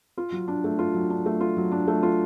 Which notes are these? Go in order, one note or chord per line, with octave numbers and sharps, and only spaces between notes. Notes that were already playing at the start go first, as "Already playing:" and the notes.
F4
F#3
D4
A3
F4
F#3
D4
A3
F4
F#3
D4
A3
F4